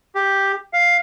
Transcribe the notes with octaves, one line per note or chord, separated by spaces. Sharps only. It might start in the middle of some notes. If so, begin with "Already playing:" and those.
G4
F5